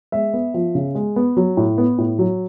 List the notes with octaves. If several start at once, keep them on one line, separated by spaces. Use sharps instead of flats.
G#3 E5
B3
F3
C#3
G#3
B3
F#3
A2
B3
A2
F#3